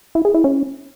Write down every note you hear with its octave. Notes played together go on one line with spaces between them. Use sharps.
E4
G#4
E4
C#4